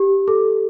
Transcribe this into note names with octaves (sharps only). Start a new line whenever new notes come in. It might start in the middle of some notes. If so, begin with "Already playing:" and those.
Already playing: G4
A4